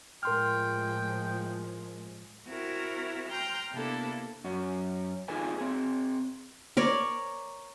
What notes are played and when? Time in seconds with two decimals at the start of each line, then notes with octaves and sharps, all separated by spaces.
0.23 A2 F3 G#3 A#4 G5 C6 F6
2.48 C4 E4 F#4 A#4
3.28 G5 A#5 C6 F6 G6
3.70 C3 A#3 B3 D4 E4 A4
4.44 F#2 C#4
5.28 D#4 F4 G#4 A4 B4 G#5
5.58 C4 G#4
6.77 A#4 C#5 D5